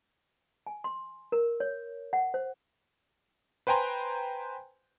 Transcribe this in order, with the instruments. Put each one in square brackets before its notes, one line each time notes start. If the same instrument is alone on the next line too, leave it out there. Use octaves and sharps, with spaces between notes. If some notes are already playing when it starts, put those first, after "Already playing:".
[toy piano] G#5
C6
A#4
C#5
F#5
C5
[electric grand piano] B4 C5 G5 G#5 A#5 C6